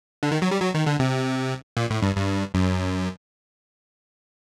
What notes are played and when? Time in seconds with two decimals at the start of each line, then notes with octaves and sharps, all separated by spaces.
0.23 D3
0.32 D#3
0.42 F#3
0.51 G3
0.61 F#3
0.74 D#3
0.86 D3
0.99 C3
1.77 A#2
1.90 A2
2.02 G2
2.16 G2
2.54 F#2